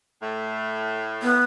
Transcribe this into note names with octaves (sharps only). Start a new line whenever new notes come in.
A2 A3
B3